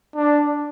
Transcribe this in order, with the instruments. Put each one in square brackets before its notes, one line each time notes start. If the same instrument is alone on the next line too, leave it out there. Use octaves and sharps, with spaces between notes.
[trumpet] D4